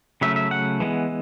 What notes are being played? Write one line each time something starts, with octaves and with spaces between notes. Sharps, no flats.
C#3 F#3 A3 C#4 E5
E5
F#5
E3 G#3 B3